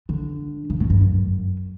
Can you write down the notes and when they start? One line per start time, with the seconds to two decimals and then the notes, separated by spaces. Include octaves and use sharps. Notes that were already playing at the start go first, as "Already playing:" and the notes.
0.09 D3
0.70 C#3
0.80 B2
0.90 G2
1.01 F#2